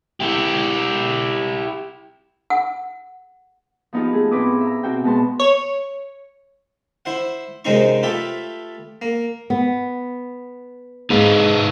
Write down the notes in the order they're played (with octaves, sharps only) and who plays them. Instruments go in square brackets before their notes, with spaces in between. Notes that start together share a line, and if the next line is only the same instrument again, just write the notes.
[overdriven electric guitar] E4 G4
[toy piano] F#5
[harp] F3 B3 D#4 F4 G4
A3 G#4
A2 B3 C4 B4 D6 D#6
E5 A#5
B2 C4 F#4 C5 G5
B2 G#3 B3 B4 A5 C6
[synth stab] C#5
[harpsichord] E4 C5 F#5
F#2 C3 G#3 C4 D#4 C#6
A3 F4 G4 A4 B4
A#3
[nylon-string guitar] B3
[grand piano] G#2 [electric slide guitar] D#4 B4 F5